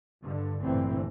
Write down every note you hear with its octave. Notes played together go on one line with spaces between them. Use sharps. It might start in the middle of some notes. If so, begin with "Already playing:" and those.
G2 D3
A1 G2 A#2 D3 E3 C4